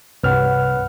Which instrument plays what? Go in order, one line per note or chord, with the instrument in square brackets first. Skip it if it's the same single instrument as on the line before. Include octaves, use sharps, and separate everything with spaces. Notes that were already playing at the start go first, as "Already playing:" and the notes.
[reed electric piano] C2 G2 F6 [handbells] B4 C#5 F#5